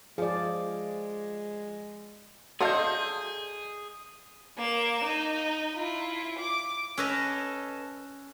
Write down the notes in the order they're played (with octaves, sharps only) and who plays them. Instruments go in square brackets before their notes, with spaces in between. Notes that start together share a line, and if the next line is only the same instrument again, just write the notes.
[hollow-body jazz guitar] F3 [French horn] G#3 [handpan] G#4 D5
[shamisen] F#4 D5 F5 [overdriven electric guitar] G#4 [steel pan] A4 D#5 [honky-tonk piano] C6 G6
[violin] A#3 E7
D#4
E4 F4
D6
[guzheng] C#4 [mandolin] A4 B4 D#5